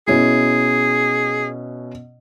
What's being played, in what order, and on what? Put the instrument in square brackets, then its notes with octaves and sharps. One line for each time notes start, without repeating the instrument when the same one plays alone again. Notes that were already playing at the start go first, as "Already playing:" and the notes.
[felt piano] B2 C#4 E4 [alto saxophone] G#4